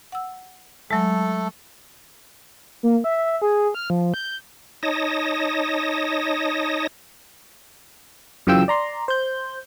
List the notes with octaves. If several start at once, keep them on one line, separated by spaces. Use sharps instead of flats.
F#5 E6
F#3 G#3 A3 A4
A#3
E5
G#4
F6
F3
G6
D#4 C#5 D#5 A5 D#6 A#6
F#2 C#3 E3 F4 G5 E6
D5 A#5 C6
C5 G6